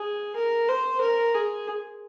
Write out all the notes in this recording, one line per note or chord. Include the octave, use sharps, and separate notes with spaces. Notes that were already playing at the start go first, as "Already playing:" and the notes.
Already playing: G#4
A#4
C5
A#4
G#4